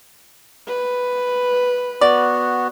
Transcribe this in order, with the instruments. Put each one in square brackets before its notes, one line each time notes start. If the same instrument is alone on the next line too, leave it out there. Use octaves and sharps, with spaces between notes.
[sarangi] B4
[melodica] B3 F#4 [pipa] D5